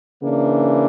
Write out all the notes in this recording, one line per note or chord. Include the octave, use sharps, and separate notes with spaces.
C#3 E3 A#3 D4